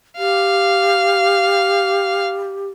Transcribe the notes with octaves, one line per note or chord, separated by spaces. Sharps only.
G4 F5